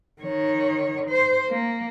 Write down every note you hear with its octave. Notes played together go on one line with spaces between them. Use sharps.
D#3 C#5
C5
A#3